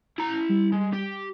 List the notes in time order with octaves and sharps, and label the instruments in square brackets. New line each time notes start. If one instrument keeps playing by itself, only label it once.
[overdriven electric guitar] E4 A#5
[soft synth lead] G3
[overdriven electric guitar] G#3
G4